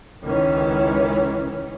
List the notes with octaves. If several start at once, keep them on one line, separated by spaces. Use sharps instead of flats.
C#2 D#3 E3 C#4